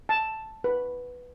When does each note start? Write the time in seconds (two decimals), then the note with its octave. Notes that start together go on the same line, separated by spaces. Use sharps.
0.09 A5
0.64 B4